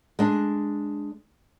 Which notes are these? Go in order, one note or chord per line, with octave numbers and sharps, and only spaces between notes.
G#3 D4